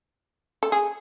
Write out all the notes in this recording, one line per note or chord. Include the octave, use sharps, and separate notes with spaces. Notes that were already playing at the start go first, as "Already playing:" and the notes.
A4
G#4